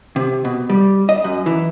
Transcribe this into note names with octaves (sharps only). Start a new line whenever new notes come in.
C3
B2
G3
D#5
F#2
E3